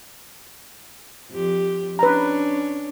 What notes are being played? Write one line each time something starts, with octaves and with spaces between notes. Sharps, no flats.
F2 G4
C#4 D4 B4 A#5